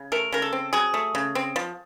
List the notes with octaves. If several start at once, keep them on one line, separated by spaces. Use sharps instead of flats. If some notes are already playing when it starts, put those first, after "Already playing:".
Already playing: C#3
A3 A#4
C#3 A#4
A4
C4
F#3 G#4
A3
C#3
C4
F3